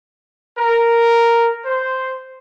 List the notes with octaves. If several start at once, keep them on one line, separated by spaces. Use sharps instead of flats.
A#4
C5